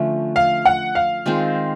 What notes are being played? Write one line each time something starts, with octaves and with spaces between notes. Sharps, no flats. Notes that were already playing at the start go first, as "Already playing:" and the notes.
Already playing: D3 F3 A3 C#4
F5
F#5
F5
D#3 G#3 C4 F4